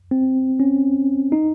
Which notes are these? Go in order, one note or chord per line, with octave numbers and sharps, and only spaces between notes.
C4
C#4
D#4